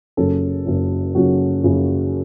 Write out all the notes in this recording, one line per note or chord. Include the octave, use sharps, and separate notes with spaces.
F#1 F#2 C#3 F#3 C#4 A4
F#1 F#2 C#3 F#3 C#4
F#1 F#2 C#3 F#3 C#4 F#4
F#1 F#2 C#3 F#3 C#4